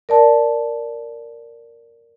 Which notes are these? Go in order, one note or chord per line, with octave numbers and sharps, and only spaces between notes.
A#4 D5 A5